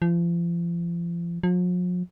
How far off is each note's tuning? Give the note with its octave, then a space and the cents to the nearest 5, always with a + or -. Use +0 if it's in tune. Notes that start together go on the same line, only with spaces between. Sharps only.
F3 -35
F3 +45